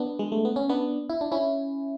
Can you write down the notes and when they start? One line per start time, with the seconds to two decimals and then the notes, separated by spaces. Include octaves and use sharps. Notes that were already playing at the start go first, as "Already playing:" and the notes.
Already playing: B3 D4
0.19 G#3
0.32 A3
0.45 B3
0.56 C#4
0.69 B3 D4
1.10 E4
1.21 D4
1.32 C#4 E4